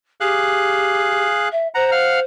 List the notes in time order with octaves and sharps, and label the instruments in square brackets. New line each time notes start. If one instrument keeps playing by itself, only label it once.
[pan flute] G4 [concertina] G#4 F5 F#6
[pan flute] E5
[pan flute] C5 [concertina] F#5 A#5
[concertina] F5 F#5 F6